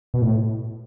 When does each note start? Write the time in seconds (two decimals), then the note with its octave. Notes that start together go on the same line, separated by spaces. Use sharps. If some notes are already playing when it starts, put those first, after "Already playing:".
0.14 B2
0.22 A2